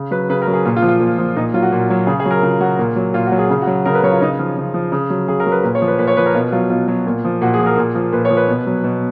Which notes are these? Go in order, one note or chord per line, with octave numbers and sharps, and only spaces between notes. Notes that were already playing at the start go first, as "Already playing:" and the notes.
Already playing: C#3
F#3 B4
C#3 B4
A#4
F#3
G#4
A#2 F4
F4
F3
F4
A#2
F3
A#2 D#4
F#3 F4
F#4
A#2
F#3
C#3 G#4
G#4
F#3
A#4
C#3 F4
F#3 F#4
A#2
F#3
A#2 F4
F#4
F#3
G#4
C#3
F#4
F#3
C#3 A#4
B4
F#3 C#5
F4
C#3 D#4
F3 F4
C#3
F3
C#3
F#3
C#3 G#4
A#4
F#3
B4
A#2 B4
C#5
F3
B4
A#2 B4
C#5
F3 B4
A#4
B2 F4
F#3 F4
B2 F4
F#3
A#2
F3
A#2 F#4
G#4
F3
A#4
A#2
F3
A#2 B4
C#5
F3
B4
B2
F#3
B2